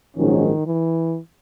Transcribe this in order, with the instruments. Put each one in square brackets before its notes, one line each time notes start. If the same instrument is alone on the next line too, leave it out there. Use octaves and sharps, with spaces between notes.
[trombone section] A#1 G#2 F#3 C#4 [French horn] D#3
[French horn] E3